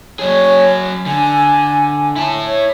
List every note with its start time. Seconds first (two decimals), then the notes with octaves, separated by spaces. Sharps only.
0.19 F#3 G#4 C#5
1.06 D3 G#5
2.16 E4 A5
2.43 C#5